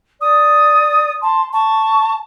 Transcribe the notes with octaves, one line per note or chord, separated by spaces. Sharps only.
D5 D#6
A5 C6
A5 C#6